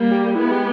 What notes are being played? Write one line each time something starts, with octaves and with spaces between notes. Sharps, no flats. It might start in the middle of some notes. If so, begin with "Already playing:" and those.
Already playing: G3 A#3
G4
G4
G#3 B3 E4
G4